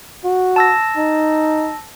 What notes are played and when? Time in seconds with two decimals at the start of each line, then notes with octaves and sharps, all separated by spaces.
0.24 F#4
0.56 A5 E6 A#6
0.97 D#4